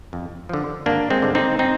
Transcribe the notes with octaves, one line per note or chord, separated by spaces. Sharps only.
F2
D3 F3
G#1 A#3 D4
G#3 C4
G2 D3
C4 D#4
C4 D#4